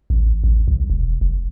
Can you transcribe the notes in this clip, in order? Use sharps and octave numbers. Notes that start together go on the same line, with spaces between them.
A1
A1
C2
E1
F1